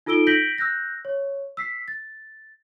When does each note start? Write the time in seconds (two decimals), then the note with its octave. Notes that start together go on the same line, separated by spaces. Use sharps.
0.06 D#4 F4 A4 E6 D7 G7
0.27 G6 A#6 B6 D7 F#7 G7
0.58 E6 F#6 G6 A#6
1.05 C#5
1.57 E6 B6 C7
1.88 A6